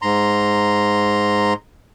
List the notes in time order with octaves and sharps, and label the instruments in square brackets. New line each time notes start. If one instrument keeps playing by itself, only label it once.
[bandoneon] G#2 A#5 C6